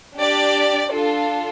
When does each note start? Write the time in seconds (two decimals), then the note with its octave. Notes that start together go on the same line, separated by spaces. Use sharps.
0.19 D4 G4 D5
0.91 D4 F4 A4